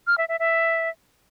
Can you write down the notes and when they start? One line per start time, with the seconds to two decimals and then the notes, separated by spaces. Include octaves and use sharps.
0.07 F6
0.18 E5
0.29 E5
0.39 E5